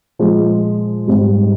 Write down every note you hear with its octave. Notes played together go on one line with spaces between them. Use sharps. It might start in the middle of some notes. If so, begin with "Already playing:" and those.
A#2 F3 G#3
G#2 G3